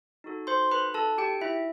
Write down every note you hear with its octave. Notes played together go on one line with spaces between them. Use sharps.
D#4 F#4 A4
C5 C6
B4 B5
A4 A5
G4 G5
E4 E5